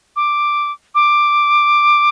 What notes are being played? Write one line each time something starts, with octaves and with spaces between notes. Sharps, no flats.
D6
D6